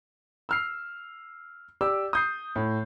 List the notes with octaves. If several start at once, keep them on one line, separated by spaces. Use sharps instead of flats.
E6 F6 C7
G4 D5 D6 E6
D#6 G6 C7
A2